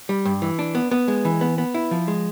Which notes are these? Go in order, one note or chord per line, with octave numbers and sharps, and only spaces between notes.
G3
G2
E3
D4
B3
B3
G#3
E3
B3
B3
E4
F3
G#3